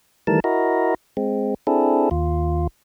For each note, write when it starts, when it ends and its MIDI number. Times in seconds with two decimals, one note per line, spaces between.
0.27 0.40 51
0.27 0.40 52
0.27 0.40 55
0.27 0.40 57
0.27 0.40 70
0.27 0.40 81
0.44 0.94 64
0.44 0.94 66
0.44 0.94 70
0.44 0.94 75
1.17 1.54 56
1.17 1.54 60
1.67 2.09 60
1.67 2.09 62
1.67 2.09 64
1.67 2.09 68
1.67 2.09 69
2.11 2.67 39
2.11 2.67 65